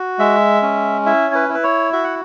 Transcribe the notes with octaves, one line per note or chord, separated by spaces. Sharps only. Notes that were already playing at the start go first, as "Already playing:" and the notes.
Already playing: F#4
G#3 E5
C#4
E4 E5
C#5
B4
E4
B4
C#5
F#4 E5
F#5